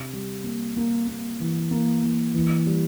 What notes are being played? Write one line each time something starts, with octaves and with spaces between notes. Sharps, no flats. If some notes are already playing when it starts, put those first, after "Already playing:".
Already playing: C3
G3
A#3
A#3
A#3
E3
A#3
A#3
E3
G3